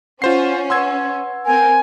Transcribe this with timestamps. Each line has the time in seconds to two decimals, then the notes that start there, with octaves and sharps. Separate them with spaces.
0.22 C#4 F4 C5 F#5 C7
0.70 B4 F#5 C6 E6 G#6
1.46 C4 A#4 G#5